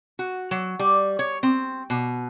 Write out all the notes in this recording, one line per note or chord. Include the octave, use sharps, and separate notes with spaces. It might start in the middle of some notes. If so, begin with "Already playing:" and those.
F#4
F#3
G3
C#5
C4
B2